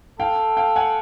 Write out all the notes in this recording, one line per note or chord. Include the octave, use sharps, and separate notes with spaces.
A4 F5 G5
F5 G5
F#5 G#5